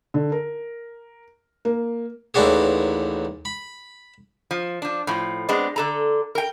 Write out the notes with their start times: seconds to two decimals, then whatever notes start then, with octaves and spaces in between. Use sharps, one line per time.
0.14 D3
0.32 A#4
1.65 A#3
2.34 A1 D#2 E3 D4 F#4 G#4
3.45 B5
4.51 F3
4.82 F3 D4
5.07 A2 F3
5.49 G#3 B3 C4 D4
5.76 D3 A4 A#5
6.35 A#4 G5